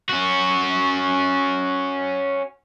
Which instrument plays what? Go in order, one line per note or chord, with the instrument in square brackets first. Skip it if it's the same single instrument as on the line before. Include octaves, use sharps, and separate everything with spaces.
[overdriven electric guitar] C#4 F#4